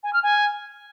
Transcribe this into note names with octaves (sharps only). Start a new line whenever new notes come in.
G#5
F6
G#5